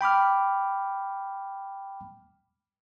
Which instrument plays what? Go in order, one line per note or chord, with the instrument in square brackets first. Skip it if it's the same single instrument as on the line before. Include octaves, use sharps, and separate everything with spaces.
[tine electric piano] G5 B5 D6 F6